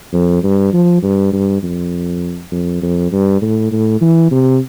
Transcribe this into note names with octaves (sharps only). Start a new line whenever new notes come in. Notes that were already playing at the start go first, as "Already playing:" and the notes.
F2
G2
F3
G2
G2
F2
F2
F2
G2
A2
A2
E3
C3